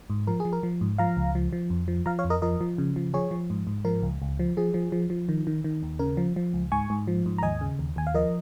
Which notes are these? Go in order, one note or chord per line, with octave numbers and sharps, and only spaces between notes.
G#2
F3 A#4
G#4
F3
A#4
F3
G#2
F3 F5 A#5
C#2
F3
F3
F2
F3
F3 F5 A#5
C#5 F5
F2
A#4 D#5
F3 A#4 D#5
F3
C#3
F3
F3 G#4 C#5
F3
G#2
G#2
F3 A#4
C#2
C#2
F3
F3 G#4
F3
F3
F3
D#3
D#3
D#3
D#2
C#3 A#4
F3
F3
C#2
G#2 G#5 C#6
G#2
F3
G#2
A#5
D#2 D#5 G#5
C#3
D#2
D#2 G#5
F5
F3 A#4 D#5